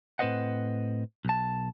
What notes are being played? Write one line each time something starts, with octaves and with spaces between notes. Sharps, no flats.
A2 C4 B4 C5 D#5 F#5
B1 A5